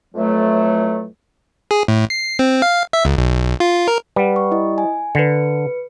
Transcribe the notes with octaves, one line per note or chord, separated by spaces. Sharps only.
F2 A2 E3 F#3 A3
G#4
A2
C7
C4
F5
E5
C#2
B1
F4
A#4
G3 B4 F#5
C#6
E4 D#5
G#5
D3 B4 C#7